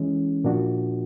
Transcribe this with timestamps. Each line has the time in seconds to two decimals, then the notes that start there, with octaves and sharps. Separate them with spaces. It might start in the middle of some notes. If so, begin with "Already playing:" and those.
Already playing: E3 G#3 C#4
0.44 A#2 F3 A#3 D4 F#4